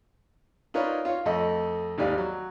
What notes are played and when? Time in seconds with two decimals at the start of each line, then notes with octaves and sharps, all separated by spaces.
0.74 D#4 F4 A#4 B4 C#5 D5
1.05 F4 C#5
1.26 F2 A3 A4 D#5
1.98 G#1 D#2 D#4 G4 D5 F5
2.18 F#3